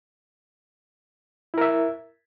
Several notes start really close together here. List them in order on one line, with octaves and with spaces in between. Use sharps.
E4 A#4 E5